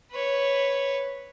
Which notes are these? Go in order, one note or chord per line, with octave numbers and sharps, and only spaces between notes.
B4 C#5